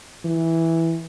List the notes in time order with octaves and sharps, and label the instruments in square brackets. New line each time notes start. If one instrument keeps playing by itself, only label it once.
[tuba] E3